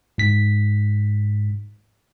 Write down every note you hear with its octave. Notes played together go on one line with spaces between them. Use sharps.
G#2 B6